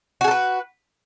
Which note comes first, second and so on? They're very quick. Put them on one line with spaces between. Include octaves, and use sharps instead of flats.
F#4 G#4 A4 B4